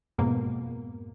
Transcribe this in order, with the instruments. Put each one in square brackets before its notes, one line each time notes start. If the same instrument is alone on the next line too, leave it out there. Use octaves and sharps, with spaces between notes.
[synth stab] F2 G#2 B2 A#3